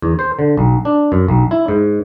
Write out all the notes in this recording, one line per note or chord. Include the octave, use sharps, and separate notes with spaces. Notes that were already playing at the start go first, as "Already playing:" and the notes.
E2
C5
D3
B1
D4
F#2
B1
E4
G#2